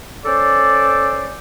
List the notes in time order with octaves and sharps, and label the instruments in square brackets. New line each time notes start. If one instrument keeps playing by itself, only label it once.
[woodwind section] C#4 A4 C5 D5